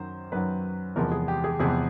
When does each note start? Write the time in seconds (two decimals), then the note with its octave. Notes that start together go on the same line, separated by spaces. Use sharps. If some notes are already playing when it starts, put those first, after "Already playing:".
Already playing: F#2 D#3 F#3 C5
0.32 F#2 D#3 F#3 B4
0.96 E2 C3 F3 G#3 B3 A#4
1.12 G#4
1.28 G4
1.44 G#4
1.60 E2 C3 F3 G#3 B3 G#4